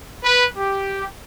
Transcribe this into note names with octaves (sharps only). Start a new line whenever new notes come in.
B4
G4